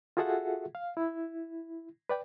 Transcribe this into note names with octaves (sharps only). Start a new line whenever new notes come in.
F4 F#4 G#4 A4 E5 F#5
F5
E4
B4 D5 G5